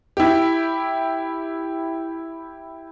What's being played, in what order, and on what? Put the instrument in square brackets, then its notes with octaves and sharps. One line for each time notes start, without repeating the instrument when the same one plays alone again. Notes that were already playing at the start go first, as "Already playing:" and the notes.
[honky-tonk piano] E4 G4